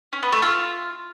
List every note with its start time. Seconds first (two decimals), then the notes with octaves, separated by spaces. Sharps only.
0.13 C#4
0.23 B3
0.32 A3
0.42 F4